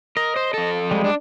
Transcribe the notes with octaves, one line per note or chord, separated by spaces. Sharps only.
A#4 D#5
C5
F2 A4
G3 G#3
D4